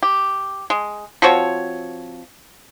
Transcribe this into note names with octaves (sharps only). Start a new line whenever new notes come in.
G4
G#3
F3 C4 F#4 C#5